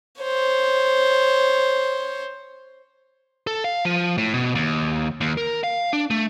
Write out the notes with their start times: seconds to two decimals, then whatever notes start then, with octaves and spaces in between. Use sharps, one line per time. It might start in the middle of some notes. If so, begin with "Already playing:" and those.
0.22 C5 C#5
3.47 A4
3.64 F5
3.85 F3
4.18 A2
4.34 B2
4.55 D#2
5.21 D#2
5.37 A#4
5.64 F5
5.93 D4
6.11 A3